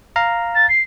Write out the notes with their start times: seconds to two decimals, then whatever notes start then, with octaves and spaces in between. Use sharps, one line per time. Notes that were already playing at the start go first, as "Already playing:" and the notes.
0.16 F5 A#5
0.54 A6
0.68 C7